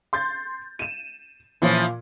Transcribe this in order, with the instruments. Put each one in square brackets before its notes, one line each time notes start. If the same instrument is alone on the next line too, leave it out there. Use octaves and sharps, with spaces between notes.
[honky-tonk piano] C6 G6 A6
D#7 E7
[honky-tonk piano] A#2 [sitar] E3 F3 C#4